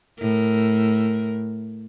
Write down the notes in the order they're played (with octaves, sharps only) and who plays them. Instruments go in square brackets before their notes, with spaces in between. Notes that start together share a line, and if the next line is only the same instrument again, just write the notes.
[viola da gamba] A2 A#4